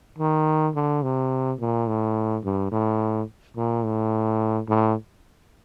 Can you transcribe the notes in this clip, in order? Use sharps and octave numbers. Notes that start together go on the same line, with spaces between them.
D#3
D3
C3
A#2
A2
G2
A2
A#2
A2
A2